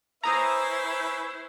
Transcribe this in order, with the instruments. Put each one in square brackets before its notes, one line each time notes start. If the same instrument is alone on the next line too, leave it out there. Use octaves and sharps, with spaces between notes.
[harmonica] C#4 B4 E5 [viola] E4 C5 [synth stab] A#5 D#6